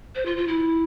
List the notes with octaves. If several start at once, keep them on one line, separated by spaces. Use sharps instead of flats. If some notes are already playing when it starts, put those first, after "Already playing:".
C5
F4
F4
E4